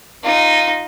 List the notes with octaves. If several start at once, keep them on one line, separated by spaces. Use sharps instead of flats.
D#4 F4